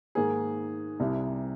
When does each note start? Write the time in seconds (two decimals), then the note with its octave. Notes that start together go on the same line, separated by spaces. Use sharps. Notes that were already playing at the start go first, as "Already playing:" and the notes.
0.15 G#2 D#3 A#3 G#4
1.00 C2 C3 G3